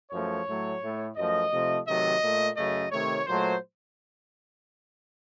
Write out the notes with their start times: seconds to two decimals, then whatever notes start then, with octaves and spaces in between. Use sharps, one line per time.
0.11 F#2 F3 A3 C#5
0.47 A2 F#3 A3
0.82 A2 A3
1.16 F#2 F3 A3 D#5
1.52 C3 F3 A3
1.86 C3 D#3 F#3 A3 D#5
2.21 A#2 A3
2.56 F#2 C#3 F#3 A3 D#5
2.91 C3 D#3 A3 C#5
3.26 A#2 F#3 A3 C5